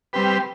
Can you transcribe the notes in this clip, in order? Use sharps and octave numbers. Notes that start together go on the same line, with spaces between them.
G3 C4 G4 B4